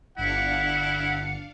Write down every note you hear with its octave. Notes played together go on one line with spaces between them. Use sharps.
G1 D4 E4 F5 F#5 C#7